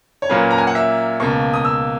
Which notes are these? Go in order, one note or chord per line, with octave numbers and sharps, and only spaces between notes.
C#5
A#2 F#3 A#3 C#4 B4
A#5
G#5
F#5
E5
C#2 B2 A#3 C#6
D#6
E6